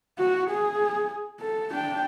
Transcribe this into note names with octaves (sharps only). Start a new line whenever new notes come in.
F#4
G#4
A4
D4 G5